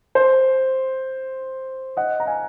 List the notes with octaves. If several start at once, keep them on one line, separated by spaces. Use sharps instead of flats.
C5
D#5 F#5
A#5
F5 G#5